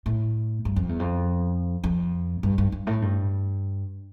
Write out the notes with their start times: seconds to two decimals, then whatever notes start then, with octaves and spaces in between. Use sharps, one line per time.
0.06 A2
0.65 G2
0.76 F2
0.89 E2
0.99 F2
1.84 F2
2.43 G2
2.58 G2
2.72 G2
2.87 A2
3.02 G2